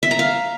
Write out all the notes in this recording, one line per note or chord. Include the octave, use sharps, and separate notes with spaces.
E5
A#5
F5